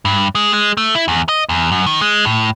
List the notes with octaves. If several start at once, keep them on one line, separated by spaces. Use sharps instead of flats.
G2
G#3
G#3
A3
E4
E2
D#5
E2
F#2
D#3
G#3
A2